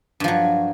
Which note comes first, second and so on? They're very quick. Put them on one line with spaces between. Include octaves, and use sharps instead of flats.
G2 F3 F#3